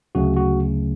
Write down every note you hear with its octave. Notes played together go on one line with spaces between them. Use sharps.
D2 C#3 F#3 A3 F#4
F#4